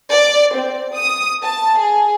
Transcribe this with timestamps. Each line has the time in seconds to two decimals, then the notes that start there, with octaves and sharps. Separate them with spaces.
0.11 D5
0.56 C4
0.95 D#6
1.43 A5
1.79 G#4